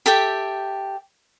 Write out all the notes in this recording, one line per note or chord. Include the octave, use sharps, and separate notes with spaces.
G4 A4 E5 G5